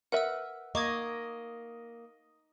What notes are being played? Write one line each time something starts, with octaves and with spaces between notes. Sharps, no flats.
A#4 B4 E5 F#5 E6
A#3 D#5 C#6 D6 G#6